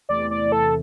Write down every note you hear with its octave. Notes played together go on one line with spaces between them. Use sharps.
E2 C3 E3 A3 D5
D5
A4